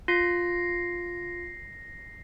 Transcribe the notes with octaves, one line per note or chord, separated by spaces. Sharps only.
F4 A#6 C7